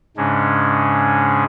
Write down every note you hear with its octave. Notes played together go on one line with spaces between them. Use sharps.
G#2 C#3 G#3 C#4 D4